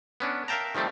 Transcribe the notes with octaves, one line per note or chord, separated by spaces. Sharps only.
B3 C#4 D4
A#4 E5 F5 G5 A5 A#5
D#3 F3 G3 A3 C4